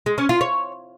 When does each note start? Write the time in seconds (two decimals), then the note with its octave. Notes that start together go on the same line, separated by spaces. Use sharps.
0.06 G#3
0.18 C#4
0.29 F4
0.41 C#5